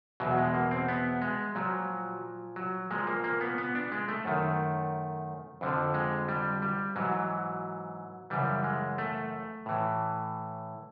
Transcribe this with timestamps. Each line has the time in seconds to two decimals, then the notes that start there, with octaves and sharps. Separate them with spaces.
0.20 E2 B2 F#3
0.38 G#3
0.54 A#3
0.71 C4
0.88 B3
1.22 G#3
1.55 A#2 F3 F#3
2.56 F#3
2.91 A#2 F3 G#3
3.07 A#3
3.24 A#3
3.41 B3
3.58 B3
3.75 D4
3.92 G#3
4.08 A3
4.25 F#2 D#3
5.61 F2 D3 F3
5.94 G#3
6.28 G3
6.62 G3
6.96 G#2 E3 F#3
8.30 F#2 C#3 E3 G3
8.64 G#3
8.98 A3
9.66 A2 E3